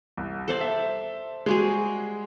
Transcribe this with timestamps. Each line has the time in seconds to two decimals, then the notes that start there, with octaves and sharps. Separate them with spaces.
0.17 C2
0.48 A4 C5 D5
0.61 E5
1.46 G3 G#3 F#4 G#4